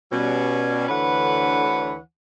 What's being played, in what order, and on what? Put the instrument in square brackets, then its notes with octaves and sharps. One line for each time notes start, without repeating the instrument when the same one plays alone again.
[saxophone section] B2 G3 C#4
D2 D3 E3 B4 C#5 F#5